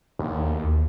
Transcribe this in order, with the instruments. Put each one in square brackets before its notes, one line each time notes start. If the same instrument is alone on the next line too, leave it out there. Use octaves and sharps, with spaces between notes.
[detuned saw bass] D#2